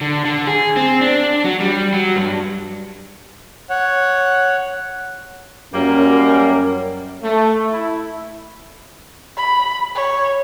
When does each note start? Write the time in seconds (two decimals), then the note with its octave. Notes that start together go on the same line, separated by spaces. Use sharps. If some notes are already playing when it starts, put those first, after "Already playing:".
0.01 D3
0.25 D3
0.47 G#4
0.77 C4
1.01 D4
1.44 F#3
1.60 G3
1.94 F#3
2.16 G2
3.70 C#5 F#5
5.74 F#2 G3 A#3 C#4
7.23 A3
7.71 E4
9.37 B5
9.95 C#5